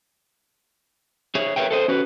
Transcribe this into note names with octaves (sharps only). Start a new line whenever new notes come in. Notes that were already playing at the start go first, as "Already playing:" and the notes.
G#4 C#5 E5
A#4 B4 C#5 E5 G5
A4 C5 D#5
C#4 F#4 B4